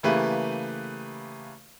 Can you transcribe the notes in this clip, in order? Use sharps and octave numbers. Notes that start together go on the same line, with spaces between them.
C#3 E3 A3 A#3 G4 B4